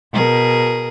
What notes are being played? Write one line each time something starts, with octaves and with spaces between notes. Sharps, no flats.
B2 G#4 A#4